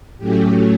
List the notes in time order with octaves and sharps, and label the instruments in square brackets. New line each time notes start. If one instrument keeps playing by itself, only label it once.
[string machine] A2 F#3 A3 C#4 G4